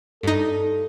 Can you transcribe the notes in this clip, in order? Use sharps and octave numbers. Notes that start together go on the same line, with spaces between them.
G2 D#4 A4